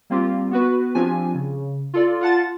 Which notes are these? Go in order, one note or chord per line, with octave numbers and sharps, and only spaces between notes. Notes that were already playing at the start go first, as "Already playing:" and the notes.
G3 A#3 C4 F4 G4
B3 F#4 B4
F3 C4 D4 F4 G4 G#5
C#3
F4 A4 D5
F4 F#5 A5 A6